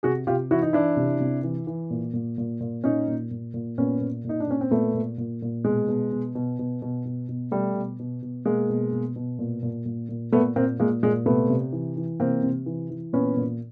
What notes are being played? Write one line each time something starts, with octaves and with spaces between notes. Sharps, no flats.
C3 F#4 G#4
C3 F4 G4
E3 E4 F#4
D#4
E3 D4 E4
C3
C3
E3
E3
A#2
A#2
A#2
A#2
A#2 C#4 D#4
A#2
A#2
A#2
A#2 B3 C#4
A#2
A#2 D#4
D4
A#2 C#4
C4
A#2 A3 B3
A#2
A#2
A#2
B2 G#3
B2
B2
B2
B2
B2
B2
B2
B2 G3 A3
B2
B2
B2
B2 G#3 A#3
B2
B2
B2
A#2
A#2
A#2
A#2
A#2 A3 B3
A#2 A#3 C4
A#2 G#3 A#3
A#2 G#3
C3 A3 B3
C3
E3
E3
C3 A#3 C4
C3
E3
E3
A#2 B3 C#4
A#2